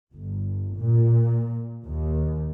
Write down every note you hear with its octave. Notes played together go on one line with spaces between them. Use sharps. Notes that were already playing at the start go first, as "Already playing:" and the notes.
G1
A#2
D#2